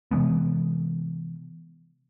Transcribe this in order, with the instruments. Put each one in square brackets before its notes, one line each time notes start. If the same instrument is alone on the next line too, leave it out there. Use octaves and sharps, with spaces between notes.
[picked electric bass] C3 E3 G#3 B3